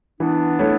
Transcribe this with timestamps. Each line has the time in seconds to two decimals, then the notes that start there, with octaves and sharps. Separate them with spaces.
0.20 E3 B3 D4
0.59 A3 E4 A4 C#5